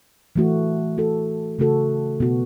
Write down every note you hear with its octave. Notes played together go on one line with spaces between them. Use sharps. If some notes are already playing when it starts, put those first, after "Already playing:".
E3 A3 F#4
A3 F#4 A4
C#3 A3 F#4 A4
B2 B3 F#4